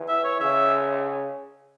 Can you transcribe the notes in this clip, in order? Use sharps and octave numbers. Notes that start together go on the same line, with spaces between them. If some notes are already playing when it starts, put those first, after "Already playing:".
Already playing: E3
E5
C#5
C#3 E5